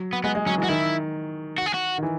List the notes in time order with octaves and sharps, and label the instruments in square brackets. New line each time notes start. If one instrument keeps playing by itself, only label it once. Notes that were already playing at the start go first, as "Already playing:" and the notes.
Already playing: [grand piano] F#3
[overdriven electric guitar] B3
[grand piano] G#3 [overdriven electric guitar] B3
[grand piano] G#3
[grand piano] F#3 [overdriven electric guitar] C#4
[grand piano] E3
[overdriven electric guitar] F#4
[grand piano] D#3 [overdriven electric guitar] E4
[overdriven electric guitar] F#4
G#4
F#4
[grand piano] D#3
E3